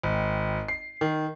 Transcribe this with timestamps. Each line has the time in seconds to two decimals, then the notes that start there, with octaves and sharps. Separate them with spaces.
0.03 G#1
0.68 C7
1.01 D#3